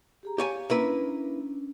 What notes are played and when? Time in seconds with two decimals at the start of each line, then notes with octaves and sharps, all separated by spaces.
0.23 G4 G#4 A#5
0.38 G4 C#5 F5 G#5
0.70 A#3 C#4 D4 E4 B4